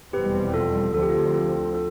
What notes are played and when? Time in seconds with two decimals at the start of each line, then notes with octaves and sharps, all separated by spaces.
0.13 F1 E2 B2 G3 C4 G4 B4
0.54 F4 A4
0.94 D2 D3 F3 C4 A4
1.02 G4
1.09 F4
1.17 G4
1.34 F4 A4
1.74 F4 A4